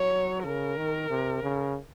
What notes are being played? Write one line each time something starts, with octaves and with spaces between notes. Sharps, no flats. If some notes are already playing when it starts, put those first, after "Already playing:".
Already playing: F#3 C#5
C#3 A#4
D#3
C3
C#3